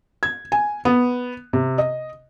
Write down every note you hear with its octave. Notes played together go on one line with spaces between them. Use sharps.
G#6
G#5
B3
C3
D#5